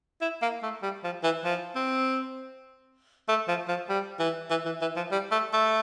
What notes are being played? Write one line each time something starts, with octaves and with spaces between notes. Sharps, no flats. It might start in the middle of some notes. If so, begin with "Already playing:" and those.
E4
A#3
A3
G3
F3
E3
F3
C4
A3
F3
F3
G3
E3
E3
E3
E3
F3
G3
A3
A3